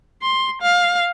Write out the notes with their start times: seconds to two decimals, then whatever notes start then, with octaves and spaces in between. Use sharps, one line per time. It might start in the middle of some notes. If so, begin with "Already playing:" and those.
0.22 C6
0.62 F5